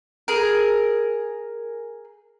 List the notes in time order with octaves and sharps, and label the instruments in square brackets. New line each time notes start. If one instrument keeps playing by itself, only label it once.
[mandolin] G#4 A#4